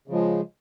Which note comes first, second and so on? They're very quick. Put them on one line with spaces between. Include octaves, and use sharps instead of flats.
C#3 F3 G#3